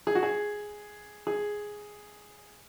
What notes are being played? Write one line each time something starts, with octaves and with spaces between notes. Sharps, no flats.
G#4
F#4
G#4
G#4